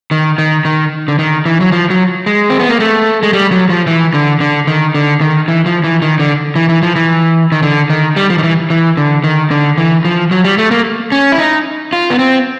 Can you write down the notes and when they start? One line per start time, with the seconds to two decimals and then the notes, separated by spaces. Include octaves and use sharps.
0.11 D#3
0.38 D#3
0.65 D#3
1.08 D3
1.19 D#3
1.46 E3
1.61 F#3
1.72 F3
1.90 F#3
2.26 G#3
2.50 C4
2.59 B3
2.69 A#3
2.80 A3
3.23 G#3
3.33 G3
3.51 F#3
3.70 F3
3.87 E3
4.14 D3
4.40 D3
4.67 D#3
4.94 D3
5.21 D#3
5.48 E3
5.66 F3
5.84 E3
6.02 D#3
6.19 D3
6.56 E3
6.69 E3
6.83 F3
6.96 E3
7.52 D#3
7.63 D3
7.90 D#3
8.16 G3
8.30 F3
8.38 D#3
8.43 E3
8.70 E3
8.97 D3
9.24 D#3
9.51 D3
9.78 E3
10.05 F3
10.31 F#3
10.44 G3
10.58 A3
10.71 A#3
11.12 C#4
11.32 E4
11.39 D#4
11.93 F4
12.10 B3
12.19 C4